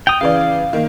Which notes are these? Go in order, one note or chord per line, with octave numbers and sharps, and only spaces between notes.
G5 D#6 F7
C#3 E3 D5 F5
D#3 A#3